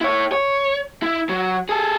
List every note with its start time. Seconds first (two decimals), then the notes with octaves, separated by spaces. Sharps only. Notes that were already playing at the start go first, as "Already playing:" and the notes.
0.01 E4 C#5
0.32 C#5
1.02 E4
1.29 F#3
1.69 G#4 A4